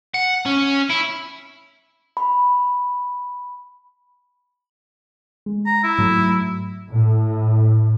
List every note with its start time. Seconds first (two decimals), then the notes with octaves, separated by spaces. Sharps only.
0.14 F#5
0.46 C#4
0.90 E4
2.17 B5
5.46 G#3
5.66 A#5
5.83 E4
5.98 G#2 F#3 A3
6.91 A2